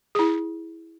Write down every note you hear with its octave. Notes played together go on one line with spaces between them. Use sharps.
E4 G#4